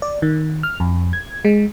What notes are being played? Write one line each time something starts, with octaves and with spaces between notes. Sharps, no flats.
D5
D#3
F6
F2
G#6
G#3